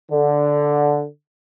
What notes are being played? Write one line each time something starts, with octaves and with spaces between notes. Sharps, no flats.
D3